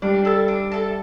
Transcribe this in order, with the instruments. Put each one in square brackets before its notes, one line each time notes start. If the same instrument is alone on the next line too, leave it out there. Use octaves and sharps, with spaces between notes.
[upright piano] G3 [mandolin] D4
[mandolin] A4 E5 A5
D4
A4 E5 A5